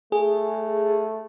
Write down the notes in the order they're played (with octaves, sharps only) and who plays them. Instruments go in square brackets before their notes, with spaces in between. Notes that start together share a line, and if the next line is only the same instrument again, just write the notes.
[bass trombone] A3 [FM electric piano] G#4